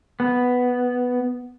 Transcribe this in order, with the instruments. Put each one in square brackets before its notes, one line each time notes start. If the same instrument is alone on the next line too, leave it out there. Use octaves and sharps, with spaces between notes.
[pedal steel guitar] B3